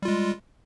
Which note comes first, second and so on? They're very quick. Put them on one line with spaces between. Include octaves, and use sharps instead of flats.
G3 F4 G#3